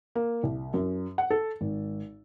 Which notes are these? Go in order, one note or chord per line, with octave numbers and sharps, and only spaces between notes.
A#3
C2
F#2
F#5
A4
G#1